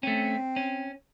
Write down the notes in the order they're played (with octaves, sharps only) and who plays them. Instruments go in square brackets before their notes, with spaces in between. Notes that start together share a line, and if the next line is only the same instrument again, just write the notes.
[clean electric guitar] A3 C#4 [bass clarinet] C4
[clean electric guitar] C#4